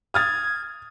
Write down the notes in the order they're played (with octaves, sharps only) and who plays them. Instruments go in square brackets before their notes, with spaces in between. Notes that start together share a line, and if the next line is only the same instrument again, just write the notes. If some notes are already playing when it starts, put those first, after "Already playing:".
[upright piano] D#6 F6 A6 [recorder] G#6